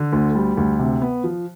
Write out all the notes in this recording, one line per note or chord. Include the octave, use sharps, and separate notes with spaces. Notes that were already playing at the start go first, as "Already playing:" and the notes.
Already playing: D3
D2
G3
D2
C3
B3
F3